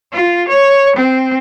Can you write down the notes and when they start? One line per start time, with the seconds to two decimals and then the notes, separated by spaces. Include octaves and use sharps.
0.13 F4
0.48 C#5
0.96 C4